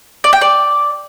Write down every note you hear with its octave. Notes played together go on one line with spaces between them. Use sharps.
D5
G5
D5